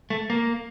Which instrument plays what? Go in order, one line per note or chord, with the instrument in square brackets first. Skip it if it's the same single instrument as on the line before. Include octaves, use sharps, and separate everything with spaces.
[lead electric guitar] A3
A#3